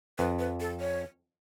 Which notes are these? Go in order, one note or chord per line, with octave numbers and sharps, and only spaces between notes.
F2 B4
B4
A4
C#5